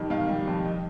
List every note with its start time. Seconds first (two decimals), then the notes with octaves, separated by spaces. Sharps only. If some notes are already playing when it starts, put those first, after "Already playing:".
Already playing: F2 D#3 G3
0.10 D#3 F5
0.29 G3
0.48 F2
0.65 D#5